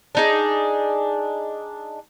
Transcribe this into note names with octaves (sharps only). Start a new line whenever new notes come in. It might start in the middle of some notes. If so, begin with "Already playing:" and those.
D4 D#4 G#4